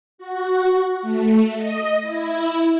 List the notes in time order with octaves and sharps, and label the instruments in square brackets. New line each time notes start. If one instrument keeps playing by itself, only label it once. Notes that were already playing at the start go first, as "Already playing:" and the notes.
[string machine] F#4
A3
D#5
E4